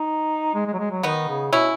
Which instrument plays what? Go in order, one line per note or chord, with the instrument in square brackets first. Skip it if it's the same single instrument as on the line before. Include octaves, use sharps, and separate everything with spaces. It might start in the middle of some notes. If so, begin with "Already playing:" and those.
Already playing: [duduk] D#4
G#3
G#3
F#3
G#3
F#3
[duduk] D#3 [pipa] B3 D#4
[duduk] C#3
[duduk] B2 [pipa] C#4 E4